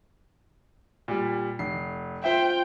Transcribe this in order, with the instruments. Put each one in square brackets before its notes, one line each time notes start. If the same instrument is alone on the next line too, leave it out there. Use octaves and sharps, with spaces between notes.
[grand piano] A#2 G3
F1 C7
[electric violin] F4 G5 [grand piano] C5 E5